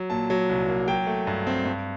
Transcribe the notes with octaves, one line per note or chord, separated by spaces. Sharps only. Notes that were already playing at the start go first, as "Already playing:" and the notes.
Already playing: F#3
A#2 A5
F#3
C2
A#3
F#3 G5
A3
G2
C4
G2